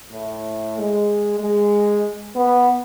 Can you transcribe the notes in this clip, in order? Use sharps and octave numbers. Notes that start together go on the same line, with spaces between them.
A2
G#3
G#3
B3